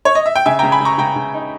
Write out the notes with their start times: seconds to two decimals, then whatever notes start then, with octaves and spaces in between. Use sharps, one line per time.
0.05 C#5
0.15 D#5
0.26 E5
0.36 G5
0.46 C#3 E5 G#5
0.59 G5 A#5
0.63 C#3
0.72 G#5 B5
0.81 C#3 A#5 C#6
0.98 C#3 G5 A#5
1.16 C#3
1.34 D#4